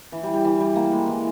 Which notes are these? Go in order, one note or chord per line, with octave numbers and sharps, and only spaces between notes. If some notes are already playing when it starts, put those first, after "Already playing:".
E3
G3
G3
E3
G3
A#3
G#3
E3